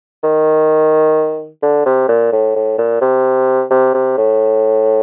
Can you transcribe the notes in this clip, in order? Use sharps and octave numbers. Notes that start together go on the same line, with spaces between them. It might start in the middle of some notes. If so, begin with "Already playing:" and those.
D#3
D3
C3
A#2
A2
A2
A#2
C3
C3
C3
A2